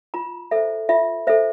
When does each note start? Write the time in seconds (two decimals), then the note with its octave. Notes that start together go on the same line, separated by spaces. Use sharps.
0.14 F4 A#5
0.51 A4 C5 E5
0.89 F4 E5
1.27 A4 C5 E5